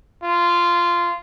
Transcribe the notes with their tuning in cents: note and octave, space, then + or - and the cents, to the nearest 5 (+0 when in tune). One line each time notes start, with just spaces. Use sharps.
F4 -15